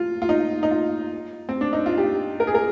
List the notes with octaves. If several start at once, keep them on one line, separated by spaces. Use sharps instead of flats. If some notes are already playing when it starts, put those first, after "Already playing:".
Already playing: F4
F4
D#4
D#4
F4
C4
D4
D#4
F4
G4
A#4
G#4
A#4